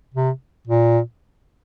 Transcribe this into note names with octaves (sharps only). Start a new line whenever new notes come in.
C3
A#2